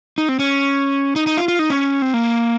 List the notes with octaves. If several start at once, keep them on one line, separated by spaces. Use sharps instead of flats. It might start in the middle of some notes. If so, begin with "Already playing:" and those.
D#4
C4
C#4
D#4
D#4
F4
F4
D#4
C#4
C4
A#3